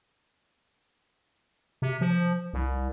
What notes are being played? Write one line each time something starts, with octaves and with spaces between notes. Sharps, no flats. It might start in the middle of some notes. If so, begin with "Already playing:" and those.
C3
F3
C2